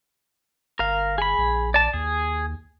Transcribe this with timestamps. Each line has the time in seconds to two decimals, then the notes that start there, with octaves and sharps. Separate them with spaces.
0.79 G1 A#4 F5
1.18 G#4 B5
1.38 A#1
1.74 D5 A5
1.93 D#2 G#4